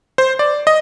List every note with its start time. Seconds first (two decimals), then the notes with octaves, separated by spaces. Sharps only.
0.18 C5
0.39 D5
0.67 D#5